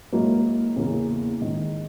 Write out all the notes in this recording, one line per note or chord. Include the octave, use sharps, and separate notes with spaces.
G#2 F#3 A#3 E4
E2 C#3 E3 A#3
D#3 G#3 D#4